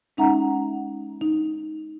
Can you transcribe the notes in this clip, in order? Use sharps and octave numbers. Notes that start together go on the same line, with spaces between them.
G#3 C#4 D#4 E5 F#5 A#5
D#4